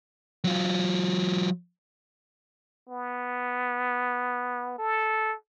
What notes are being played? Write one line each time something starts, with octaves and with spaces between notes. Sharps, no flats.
F#3 F4
B3
A4